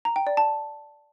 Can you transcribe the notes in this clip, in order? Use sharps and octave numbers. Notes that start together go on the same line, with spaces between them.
A#5
G5
D5
A5